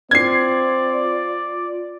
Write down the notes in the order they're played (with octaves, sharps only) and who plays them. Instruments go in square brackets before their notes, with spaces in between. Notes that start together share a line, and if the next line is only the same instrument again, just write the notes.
[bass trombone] C4 [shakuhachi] F4 [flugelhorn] D5 [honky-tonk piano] G#6 C7